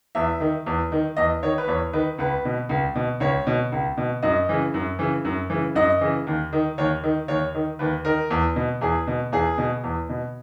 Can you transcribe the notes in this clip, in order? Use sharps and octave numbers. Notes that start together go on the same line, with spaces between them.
E2 E5
D#3
E2
D#3
E2 D#5
D#3 C#5
B4
E2 C#5
D#3 B4
C#2 B4
B2
C#2
B2
C#2 C#5
B2
C#2
B2
F#2 D#5
C#3 E3
F#2
C#3 E3
F#2
C#3 E3
F#2 D#5
C#3 E3
D#2
D#3
D#2 C#5
D#3
D#2 C#5
D#3
D#2 B4
D#3 A#4
E2
B2
E2 G#4
B2
E2 G#4
B2
E2
B2